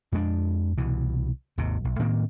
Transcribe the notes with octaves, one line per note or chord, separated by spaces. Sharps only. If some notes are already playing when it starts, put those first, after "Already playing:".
F2 G#3 C4 D4
C2 B2 E3
G#1 D#2 C3
B1
A2 D#3 A#3 C4